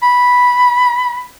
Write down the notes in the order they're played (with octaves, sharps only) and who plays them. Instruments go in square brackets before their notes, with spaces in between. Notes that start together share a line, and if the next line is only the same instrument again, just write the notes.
[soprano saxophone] B5